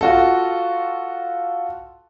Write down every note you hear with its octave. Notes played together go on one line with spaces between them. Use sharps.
F4 F#4 A4